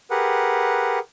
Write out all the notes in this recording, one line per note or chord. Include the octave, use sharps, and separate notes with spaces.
G4 G#4 A#4 B4 F#5